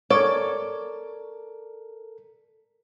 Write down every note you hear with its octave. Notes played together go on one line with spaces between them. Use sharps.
A4 A#4 C#5 D5